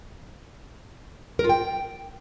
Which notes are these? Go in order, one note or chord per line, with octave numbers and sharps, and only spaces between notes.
A#4
F4
G5